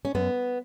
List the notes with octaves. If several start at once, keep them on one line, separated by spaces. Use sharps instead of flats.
C#4
F#2 B3